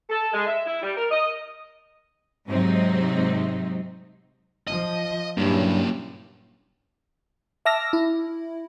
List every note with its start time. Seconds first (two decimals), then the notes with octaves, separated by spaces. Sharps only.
0.10 A4
0.34 G#3
0.47 E5
0.67 E4
0.83 G3
0.97 A#4
1.11 D#5
2.48 G#2 C3 F#3 C4 D#4
4.67 F3 D#5
5.37 G2 A#2 F#3 A#3 C#4 E4 G4
7.65 E5 A5 D6 E6 F6 A#6
7.93 E4